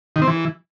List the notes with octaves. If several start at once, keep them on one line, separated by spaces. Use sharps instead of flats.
D#3
C4
E3